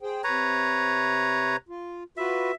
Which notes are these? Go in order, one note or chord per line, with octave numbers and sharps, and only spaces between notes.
G#4 C5 G5
C3 B4 C#5 A#5
F4
F4 F#4 B4 E5